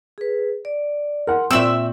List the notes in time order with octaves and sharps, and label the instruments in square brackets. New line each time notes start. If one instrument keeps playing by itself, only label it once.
[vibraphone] G#4 B4
D5
[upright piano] A#4 F#5 [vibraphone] C6
[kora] A#2 G5 [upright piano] C4 C#6 F#7 [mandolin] E5 E6